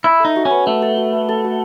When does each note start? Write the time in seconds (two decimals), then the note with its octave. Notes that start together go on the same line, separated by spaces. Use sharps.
0.04 E4 E5
0.20 D#4 A4
0.36 F#4
0.45 C#4
0.51 B3
0.66 A3 E5
0.82 A4
0.97 F#4
1.13 B3
1.29 A4
1.44 F#4